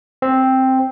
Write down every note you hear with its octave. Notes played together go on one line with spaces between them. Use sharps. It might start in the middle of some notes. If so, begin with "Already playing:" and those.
C4